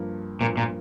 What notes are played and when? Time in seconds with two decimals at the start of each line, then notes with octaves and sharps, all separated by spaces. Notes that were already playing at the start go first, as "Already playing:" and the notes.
Already playing: G2 F3 A#3
0.41 G2 A#2 F3 A#3
0.57 A#2